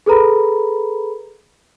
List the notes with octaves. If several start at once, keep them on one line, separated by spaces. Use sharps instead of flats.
G#4 A4 B4 A#5 B5